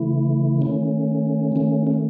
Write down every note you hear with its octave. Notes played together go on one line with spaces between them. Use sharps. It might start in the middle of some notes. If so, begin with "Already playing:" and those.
Already playing: C#3 E3 A3 E4
D#3 A3 C#4
D#3 A3 C#4
C#4